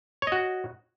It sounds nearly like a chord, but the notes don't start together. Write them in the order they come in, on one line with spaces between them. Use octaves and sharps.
C#5 D#5 F#4